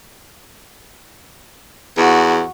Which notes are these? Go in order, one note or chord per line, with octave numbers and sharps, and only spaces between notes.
E2 F#4